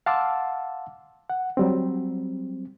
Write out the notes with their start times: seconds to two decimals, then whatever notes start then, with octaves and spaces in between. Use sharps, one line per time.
0.06 F5 F#5 A5 C6 D6 E6
1.30 F#5
1.57 F#3 G3 C4